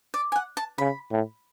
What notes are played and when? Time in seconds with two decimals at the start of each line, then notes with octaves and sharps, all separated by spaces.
0.14 D5
0.32 G#5
0.36 F#5
0.57 A5
0.78 C#3 B5
1.11 A2